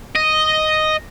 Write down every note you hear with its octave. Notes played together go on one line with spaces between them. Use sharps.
D#5